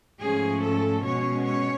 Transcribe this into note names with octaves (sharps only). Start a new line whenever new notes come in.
G#2 F3 A3 C#4 G#4
A4
B2 G#3 C#4 C#5
C#5